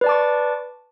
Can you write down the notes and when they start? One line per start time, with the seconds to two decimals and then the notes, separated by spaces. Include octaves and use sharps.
0.01 B4
0.04 D5
0.06 A5
0.09 D6
0.12 C#6